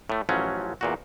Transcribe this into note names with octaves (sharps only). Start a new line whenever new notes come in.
A2 A3
A1 F3 F#3 C#4
E2 A#2 F#4